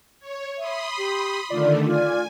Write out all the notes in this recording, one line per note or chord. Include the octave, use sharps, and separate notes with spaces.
C#5
E5 B5 C6 D#6
G4
D3 D#3 A3 F4 D5
F4 G#5